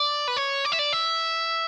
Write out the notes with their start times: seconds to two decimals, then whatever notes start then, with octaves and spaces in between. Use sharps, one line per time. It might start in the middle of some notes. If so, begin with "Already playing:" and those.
Already playing: D5
0.28 B4
0.37 C#5
0.65 D5
0.72 E5
0.79 D5
0.93 E5